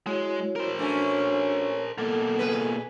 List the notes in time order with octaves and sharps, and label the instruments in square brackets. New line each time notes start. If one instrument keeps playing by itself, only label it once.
[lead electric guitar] G#3 [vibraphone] E4 F#4 C#5
[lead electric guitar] A#4 C5
[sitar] A3 C#4 [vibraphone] D4 F#4 G#5
[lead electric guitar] B2 A#3 [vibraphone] A4
[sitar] G#4 B4